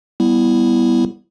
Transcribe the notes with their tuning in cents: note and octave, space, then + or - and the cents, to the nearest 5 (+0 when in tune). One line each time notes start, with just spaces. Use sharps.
G3 +0 B3 +0 E4 +0